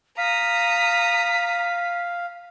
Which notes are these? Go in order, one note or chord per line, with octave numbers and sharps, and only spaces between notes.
F5 A#5 D#6 B6